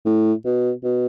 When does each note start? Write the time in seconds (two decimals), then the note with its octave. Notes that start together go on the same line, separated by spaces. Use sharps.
0.06 A2
0.45 B2
0.84 B2